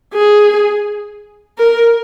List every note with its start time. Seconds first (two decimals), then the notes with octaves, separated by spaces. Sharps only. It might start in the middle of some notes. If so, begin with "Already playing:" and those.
0.14 G#4
1.58 A#4